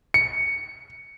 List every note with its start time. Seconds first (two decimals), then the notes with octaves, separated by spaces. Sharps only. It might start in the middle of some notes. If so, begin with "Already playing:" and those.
0.14 C#7